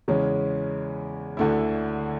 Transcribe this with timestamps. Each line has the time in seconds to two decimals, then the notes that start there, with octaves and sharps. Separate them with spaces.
0.08 E2 C#3 G#3 C#4
1.37 D2 D3 A3 E4